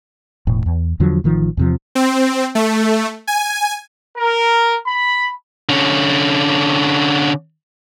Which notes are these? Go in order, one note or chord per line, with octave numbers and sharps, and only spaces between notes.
E1 A2
E2
E2 D3 F3 F#3
A1 D#3 F3
E2 C3 F3
C4
A3
G#5
A#4
B5
D3 C#4